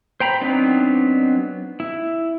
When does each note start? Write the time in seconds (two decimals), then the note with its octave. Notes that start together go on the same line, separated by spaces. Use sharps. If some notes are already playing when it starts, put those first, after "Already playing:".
0.20 C5 G5 A#5 B5
0.41 F#3 B3 C4 D4 D#4
1.80 E4